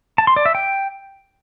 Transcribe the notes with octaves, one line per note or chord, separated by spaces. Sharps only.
A5
C6
D5
E5
G5